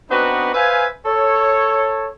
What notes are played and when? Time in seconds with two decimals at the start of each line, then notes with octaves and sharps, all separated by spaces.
0.10 B3 C4 D4 D#4 F#4 B4
0.54 B4 C5 E5 F5 G#5
1.05 A4 C#5